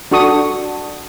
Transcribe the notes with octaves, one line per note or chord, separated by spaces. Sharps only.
D4 F#4 A4 C#6 D#6